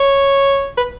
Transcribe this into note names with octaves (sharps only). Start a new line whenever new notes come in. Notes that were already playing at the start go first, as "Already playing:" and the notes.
Already playing: C#5
B4